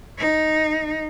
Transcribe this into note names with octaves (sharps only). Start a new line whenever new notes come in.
D#4